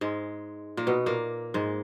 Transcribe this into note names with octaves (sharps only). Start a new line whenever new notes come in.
G#2 G#3
A#2 A#3
B2 B3
A#2 A#3
G#2 G#3